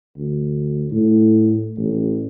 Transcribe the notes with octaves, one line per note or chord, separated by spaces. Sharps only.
D2
A2
A1